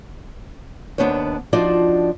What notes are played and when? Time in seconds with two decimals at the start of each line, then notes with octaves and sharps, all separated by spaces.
0.98 D#2 D3 B3 D4 C5 C#5
1.53 F3 D4 D#4 F4 F#4 D5